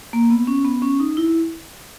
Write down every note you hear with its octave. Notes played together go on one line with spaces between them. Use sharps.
A#3
B3
C#4
B3
C#4
D#4
E4